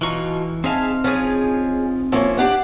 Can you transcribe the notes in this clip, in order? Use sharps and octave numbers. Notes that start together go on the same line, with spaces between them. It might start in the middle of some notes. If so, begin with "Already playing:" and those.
B2 E3 D#4 F4 C#6
C4 D#4 G#4 E5 F5 A5
F3 C#4 G#4
F3 A#3 C#4 E4
D4 G4 F#5